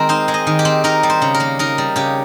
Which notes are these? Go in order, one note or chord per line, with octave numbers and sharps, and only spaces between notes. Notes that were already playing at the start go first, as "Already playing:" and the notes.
Already playing: D#3 G#3 C4 A#4
D#4 C5
G#3
D#5
D#3
G4
C4
D#4 A#4
G3
C5
C#3
A#4
A#3
D#4 A#4
G3
C#3 G4